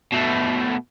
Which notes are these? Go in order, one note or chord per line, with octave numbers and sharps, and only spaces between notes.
B2 A3